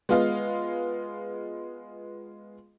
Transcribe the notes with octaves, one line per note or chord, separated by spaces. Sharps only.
G#3 B3 F4 D#5 F5